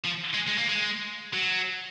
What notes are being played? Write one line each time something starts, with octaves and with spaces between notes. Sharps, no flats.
F3
G#3
G#3
A#3
G#3
F#3